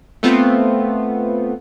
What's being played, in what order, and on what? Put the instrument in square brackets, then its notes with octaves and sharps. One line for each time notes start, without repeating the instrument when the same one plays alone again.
[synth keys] A3 B3 C4 F4